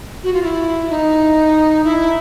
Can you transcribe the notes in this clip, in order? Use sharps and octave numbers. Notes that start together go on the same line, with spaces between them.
F#4
F4
E4
D#4
E4